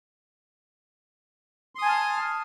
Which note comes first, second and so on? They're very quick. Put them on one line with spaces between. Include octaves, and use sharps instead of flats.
C6 D#6 G#5 A5 F6